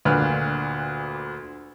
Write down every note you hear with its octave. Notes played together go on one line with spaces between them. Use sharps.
D2 A#2 B4 F6